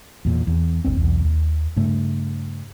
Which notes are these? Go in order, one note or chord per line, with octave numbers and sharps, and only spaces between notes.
E2 A#2
E2
G1 D2 C4
B1 E2
D#2
G2 C#3 A3